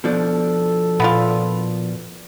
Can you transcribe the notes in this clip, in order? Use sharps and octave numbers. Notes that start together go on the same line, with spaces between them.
B2 F3 D4 A4
A#2 B3 E4 F4